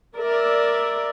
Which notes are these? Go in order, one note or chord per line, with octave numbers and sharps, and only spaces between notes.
A#4 D5 E5